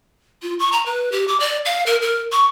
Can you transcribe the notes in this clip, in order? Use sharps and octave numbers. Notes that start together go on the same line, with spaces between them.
F4
C#6
A#5
B4
G4
D6
D5
F5
A#4
A#4
C#6